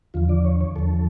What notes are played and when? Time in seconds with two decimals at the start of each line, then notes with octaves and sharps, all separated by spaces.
0.14 E2 D3 F3 F4
0.29 D5
0.45 C#5
0.61 C#5
0.76 E2 D3 F3 A4